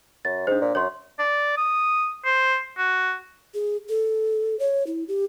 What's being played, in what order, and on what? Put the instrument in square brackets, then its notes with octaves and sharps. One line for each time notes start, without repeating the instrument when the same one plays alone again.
[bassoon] F#2 [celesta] A6
[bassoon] G#2 [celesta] D4 C5
[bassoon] A#2
[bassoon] F#2 [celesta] C#5 C6
[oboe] D5
D#6
C5
F#4
[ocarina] G#4
A4
C#5
E4
G4